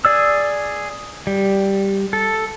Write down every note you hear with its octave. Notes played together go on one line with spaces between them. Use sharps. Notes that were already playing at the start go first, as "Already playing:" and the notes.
G#4 D5 E6
G3
A4